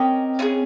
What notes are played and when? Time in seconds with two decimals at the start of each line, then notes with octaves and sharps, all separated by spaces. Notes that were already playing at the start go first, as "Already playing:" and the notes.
Already playing: C4 C#4 G4 A#4 D#5
0.39 C#4 F4 G#4